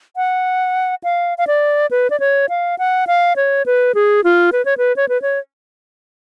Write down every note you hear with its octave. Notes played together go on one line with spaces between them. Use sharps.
F#5
F5
F5
D5
B4
D5
C#5
F5
F#5
F5
C#5
B4
G#4
F4
B4
C#5
B4
C#5
B4
C#5